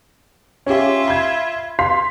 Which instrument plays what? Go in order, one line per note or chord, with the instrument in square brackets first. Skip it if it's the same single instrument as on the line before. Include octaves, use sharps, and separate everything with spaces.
[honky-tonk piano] C#4 G4 [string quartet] F4 E5
[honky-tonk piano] B5 G#6
F5 C6 B6